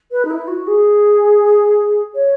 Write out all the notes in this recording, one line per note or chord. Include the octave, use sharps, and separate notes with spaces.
B4
D#4
E4
F#4
G#4
C#5